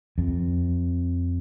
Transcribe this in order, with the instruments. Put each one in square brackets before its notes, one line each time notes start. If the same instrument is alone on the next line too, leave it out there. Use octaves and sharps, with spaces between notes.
[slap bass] F2